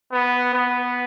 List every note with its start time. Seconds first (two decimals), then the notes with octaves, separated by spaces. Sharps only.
0.12 B3
0.54 B3